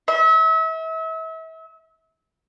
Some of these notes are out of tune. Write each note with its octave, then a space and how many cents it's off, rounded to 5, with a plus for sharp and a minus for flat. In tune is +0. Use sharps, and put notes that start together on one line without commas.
E5 -35